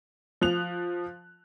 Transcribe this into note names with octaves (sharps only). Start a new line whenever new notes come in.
F3 F#6 F7